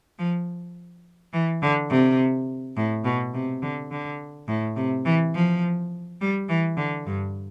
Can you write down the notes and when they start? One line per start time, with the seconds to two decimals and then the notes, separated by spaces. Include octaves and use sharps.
0.19 F3
1.33 E3
1.62 D3
1.89 C3
2.76 A2
3.04 B2
3.34 C3
3.62 D3
3.91 D3
4.48 A2
4.76 C3
5.05 E3
5.34 F3
6.20 G3
6.48 E3
6.77 D3
7.06 G2